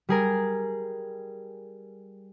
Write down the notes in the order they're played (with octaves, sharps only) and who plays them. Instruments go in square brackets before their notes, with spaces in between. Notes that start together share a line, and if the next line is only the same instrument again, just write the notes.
[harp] G3 G#4 A#4